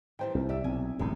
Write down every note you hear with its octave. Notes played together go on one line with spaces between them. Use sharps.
D#3 E3 G3 C5 G5
C2 C4
G4 D5 E5 E6
B1 C3 G#5
D1 A1 F#2 G#3 D#4